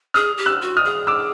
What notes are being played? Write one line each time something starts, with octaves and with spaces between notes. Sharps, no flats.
G#4 D#6 F6
G4
E6 F#6
F#4
D#6 F6
G#4
D6 E6